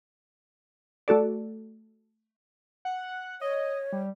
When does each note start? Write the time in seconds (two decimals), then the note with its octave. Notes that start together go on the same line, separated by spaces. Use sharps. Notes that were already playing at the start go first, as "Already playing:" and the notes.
1.08 A3 F#4 A4 D5
2.85 F#5
3.41 C#5 D#5
3.92 G3